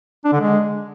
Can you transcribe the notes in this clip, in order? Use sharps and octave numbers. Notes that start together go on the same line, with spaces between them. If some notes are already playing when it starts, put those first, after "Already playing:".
D4
D3
G#3